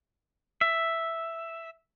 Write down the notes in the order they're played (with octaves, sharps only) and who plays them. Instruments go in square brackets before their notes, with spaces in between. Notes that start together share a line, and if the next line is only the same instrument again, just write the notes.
[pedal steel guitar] E5